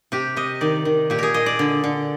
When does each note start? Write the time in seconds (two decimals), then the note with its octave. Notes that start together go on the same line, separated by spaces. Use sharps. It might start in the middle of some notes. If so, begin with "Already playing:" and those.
0.12 C3 G4
0.37 C3 D#5
0.61 D#3 D5
0.85 D#3
1.10 A#2 G4
1.19 G#4 A#4
1.34 A#2 D#5
1.46 D5
1.59 D3
1.84 D3